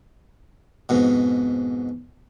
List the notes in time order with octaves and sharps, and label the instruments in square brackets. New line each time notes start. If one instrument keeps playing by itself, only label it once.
[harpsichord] F2 G#2 B2